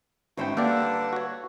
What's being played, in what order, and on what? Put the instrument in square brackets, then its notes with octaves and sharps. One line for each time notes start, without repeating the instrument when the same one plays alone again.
[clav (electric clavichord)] G#1 G5 [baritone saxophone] B2 [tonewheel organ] C#4 [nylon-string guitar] D#4 C5 E5
[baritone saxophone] D3 [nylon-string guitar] G3 A#3 [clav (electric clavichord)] G4 D5 [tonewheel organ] B4 E6
[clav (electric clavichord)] F#4 C#5